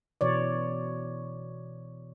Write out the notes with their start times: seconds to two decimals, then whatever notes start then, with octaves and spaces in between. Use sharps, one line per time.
0.21 B2 E3 C#5 D5